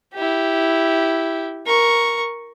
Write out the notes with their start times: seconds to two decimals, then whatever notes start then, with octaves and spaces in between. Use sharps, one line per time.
0.14 E4 G4
1.66 A#4 C#6